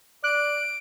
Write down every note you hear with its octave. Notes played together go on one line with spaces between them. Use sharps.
D5 F#6 D7